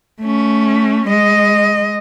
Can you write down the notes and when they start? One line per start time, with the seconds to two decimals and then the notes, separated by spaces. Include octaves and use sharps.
0.21 A3 C#4
1.08 G#3 D#5